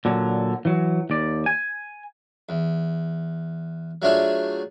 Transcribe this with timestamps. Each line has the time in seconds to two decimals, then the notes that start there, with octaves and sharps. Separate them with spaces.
0.05 A#2 D3 F#3
0.65 E3 F#3
1.10 D#2 D5
1.46 G#5
2.49 E2
4.02 F#3 A3 D4 F4 G#4